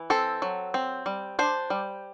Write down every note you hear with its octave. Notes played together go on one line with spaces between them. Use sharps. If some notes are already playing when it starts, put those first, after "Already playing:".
Already playing: E3
C4 A4
F#3
C4
G3
D4 C5
G3